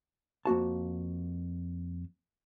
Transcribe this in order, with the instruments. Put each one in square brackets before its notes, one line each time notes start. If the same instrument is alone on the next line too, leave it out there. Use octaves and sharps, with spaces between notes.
[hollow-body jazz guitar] F2 A#3 F#4 A5